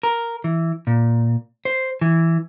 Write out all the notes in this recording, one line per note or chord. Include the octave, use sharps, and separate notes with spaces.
A#4
E3
A#2
C5
E3